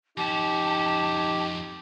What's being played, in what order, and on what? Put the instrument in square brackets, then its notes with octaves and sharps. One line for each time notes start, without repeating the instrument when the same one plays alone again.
[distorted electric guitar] F2 C#4 [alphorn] D#4 [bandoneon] G4 [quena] A5